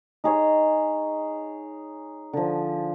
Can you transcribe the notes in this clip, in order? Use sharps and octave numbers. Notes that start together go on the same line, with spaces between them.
D#4 G#4 C#5
D3 F3